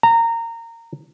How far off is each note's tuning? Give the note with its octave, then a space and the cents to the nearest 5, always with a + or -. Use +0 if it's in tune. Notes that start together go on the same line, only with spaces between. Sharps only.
A#5 -20